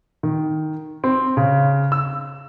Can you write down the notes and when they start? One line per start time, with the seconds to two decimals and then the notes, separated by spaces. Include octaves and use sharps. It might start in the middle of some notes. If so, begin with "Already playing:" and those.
0.23 D#3
1.04 C4
1.37 C#3
1.92 E6